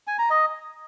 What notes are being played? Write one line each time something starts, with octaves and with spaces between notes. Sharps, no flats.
G#5
A#5
D#5